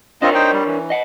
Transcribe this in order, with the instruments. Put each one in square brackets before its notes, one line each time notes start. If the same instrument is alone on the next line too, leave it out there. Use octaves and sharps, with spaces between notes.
[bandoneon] C4 F4 D#5 [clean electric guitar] D4 A#4 C#5
[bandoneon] D#4 C5 G5
G3
E3
[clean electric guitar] D#5 F#5